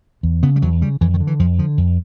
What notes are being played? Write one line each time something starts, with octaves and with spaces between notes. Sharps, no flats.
E2
C#3 B3
G3
E2 F#3
C#3 G3
F2 E3
D#3
D3
E3
F2 F3
D3 F3
F2